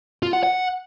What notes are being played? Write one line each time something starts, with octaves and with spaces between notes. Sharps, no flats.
F4
F#5
F#5